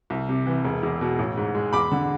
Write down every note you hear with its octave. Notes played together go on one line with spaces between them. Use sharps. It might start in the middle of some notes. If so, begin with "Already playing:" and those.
C2
C3
E3
E1
E2
B2
A1
G#2
G#3
E2 B5 D6
D3